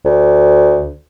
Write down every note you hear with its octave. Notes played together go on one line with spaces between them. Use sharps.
D2